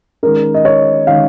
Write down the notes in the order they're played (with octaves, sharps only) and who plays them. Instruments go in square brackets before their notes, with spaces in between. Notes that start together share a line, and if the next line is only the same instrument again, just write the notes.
[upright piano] D#3 G#3 C#4 A#4
D#5
C#5
D#3 G#3 C#4 F5